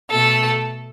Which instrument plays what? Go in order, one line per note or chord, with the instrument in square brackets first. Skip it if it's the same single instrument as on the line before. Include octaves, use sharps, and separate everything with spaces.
[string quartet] B2 A3 A4